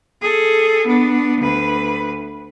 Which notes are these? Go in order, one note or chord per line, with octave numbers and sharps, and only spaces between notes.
G#4 A4
B3 D4
D2 B4